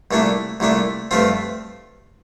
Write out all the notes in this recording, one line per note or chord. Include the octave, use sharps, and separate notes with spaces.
C2 A#2 A3 D4
C2 A#2 A3 D4
G2 F3 A3 C4 F4